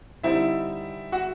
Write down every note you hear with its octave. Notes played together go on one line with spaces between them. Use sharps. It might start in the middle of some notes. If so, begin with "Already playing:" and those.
D3 G3 C4 D#4 E4 E5
F#4 F#5